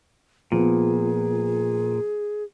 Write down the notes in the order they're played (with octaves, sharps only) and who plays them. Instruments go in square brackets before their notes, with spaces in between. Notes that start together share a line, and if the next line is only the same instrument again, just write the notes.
[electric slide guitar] A#2 [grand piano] F3 B3 [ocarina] G#4